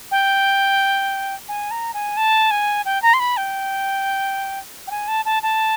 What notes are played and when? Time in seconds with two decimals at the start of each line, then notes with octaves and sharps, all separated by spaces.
0.11 G5
1.48 G#5
1.71 A#5
1.94 G#5
2.17 A5
2.51 G#5
2.85 G5
3.02 A#5
3.14 C6
3.19 B5
3.37 G5
4.87 G5
4.91 G#5
5.08 A5
5.25 A5
5.43 A5